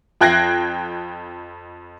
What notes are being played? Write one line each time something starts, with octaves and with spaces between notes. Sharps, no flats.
F2 G5 F#6 G#6 A#6 C7